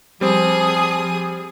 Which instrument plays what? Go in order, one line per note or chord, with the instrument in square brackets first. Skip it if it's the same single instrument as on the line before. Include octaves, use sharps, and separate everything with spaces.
[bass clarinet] F3 [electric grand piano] G3 C4 [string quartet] G#4 D#6